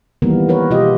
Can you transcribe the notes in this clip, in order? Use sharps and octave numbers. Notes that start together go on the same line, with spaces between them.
D#3 E3 G3 A#3 B3 A#4
F3 A#4 B4 C#5
B2 F4 G4 D#5